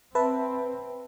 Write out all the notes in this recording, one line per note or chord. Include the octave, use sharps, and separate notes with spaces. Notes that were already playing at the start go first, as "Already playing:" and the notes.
C4 B4 E5 A5 B5